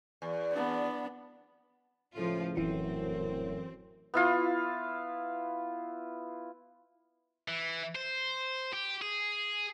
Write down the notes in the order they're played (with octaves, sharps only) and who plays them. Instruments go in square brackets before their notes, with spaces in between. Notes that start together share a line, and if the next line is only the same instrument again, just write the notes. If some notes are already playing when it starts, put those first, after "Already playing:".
[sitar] E2
[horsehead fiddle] B3 D4
[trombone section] C#2 A2 [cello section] F3 F4
[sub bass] D#1 [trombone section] F#2 A2 [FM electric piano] E3 [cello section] C4
[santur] B3 E4 F4
[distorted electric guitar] E3
C5
G4
G#4